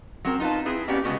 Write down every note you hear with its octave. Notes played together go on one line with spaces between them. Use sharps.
F#3 C4 A#4
D#4 F4 B4 F5 A5
C4 E4 G#4 B4
A#3 B3 C#4 G4 D5
C#3 G#3 B3 C#4 F#4 G4